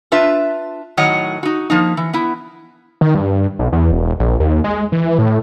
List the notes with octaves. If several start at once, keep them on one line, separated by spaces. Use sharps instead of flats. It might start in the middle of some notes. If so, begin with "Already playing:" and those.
D4 F4 B4 E5
A2 D#3 F#3 C#5 D#5 F#5
D#4 F#4
F3 A#3 D#4
E3
B3 E4
D#3
G2
B1
E2
E1
A#1
D#2
G#3
E3
A2